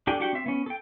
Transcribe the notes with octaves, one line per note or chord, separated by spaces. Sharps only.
D4 G4 A4 G5 G#5
D4 F#4 G4 F#5 G5
C4 E5
B3 C#4
A4 G5